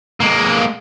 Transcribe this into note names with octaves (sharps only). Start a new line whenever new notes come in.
G#3 A#3